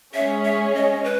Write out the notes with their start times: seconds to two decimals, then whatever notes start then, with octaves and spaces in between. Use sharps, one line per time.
0.14 G#3 C#4 G#4 C#5 E5
0.44 E5
0.75 D#5
1.04 B4